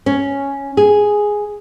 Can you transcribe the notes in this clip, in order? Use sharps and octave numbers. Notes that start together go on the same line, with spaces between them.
C#4
G#4